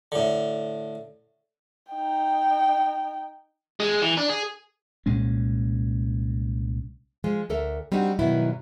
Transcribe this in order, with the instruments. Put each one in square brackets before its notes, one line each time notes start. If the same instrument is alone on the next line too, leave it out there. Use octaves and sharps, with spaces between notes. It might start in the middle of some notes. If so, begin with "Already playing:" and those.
[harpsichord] A2 D3
[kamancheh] D#4 G5
[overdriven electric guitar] G#3
E3
D4
G#4
[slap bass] C2 A#2 G#3 C#4
[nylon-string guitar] F3 G#3
D2 A4 A#4 E5
G3 C4 D4 D#4 F#4
G2 B2 D#3 F#3 B3 E4